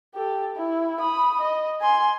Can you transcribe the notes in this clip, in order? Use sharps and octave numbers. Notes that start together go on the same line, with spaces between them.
G4 A4
E4
B5 D#6
D#5
G#5 C6